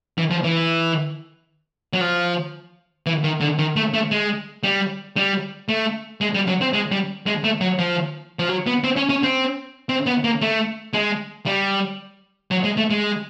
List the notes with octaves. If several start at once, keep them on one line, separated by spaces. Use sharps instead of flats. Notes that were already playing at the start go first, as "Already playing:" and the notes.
E3
F3
E3
F#3
F3
E3
D#3
D3
D#3
A3
A3
G#3
G3
G3
A3
G#3
G3
F#3
C4
G#3
G3
G#3
A3
F#3
F3
F3
F#3
B3
C4
C#4
C#4
C4
C4
B3
A#3
A3
G#3
G3
F#3
G#3
A3
G#3